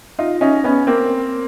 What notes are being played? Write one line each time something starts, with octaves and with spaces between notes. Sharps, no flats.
D#4 F4
C#4 D#4
B3 C#4
A#3 C4